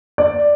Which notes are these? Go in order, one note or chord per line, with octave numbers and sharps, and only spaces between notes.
D5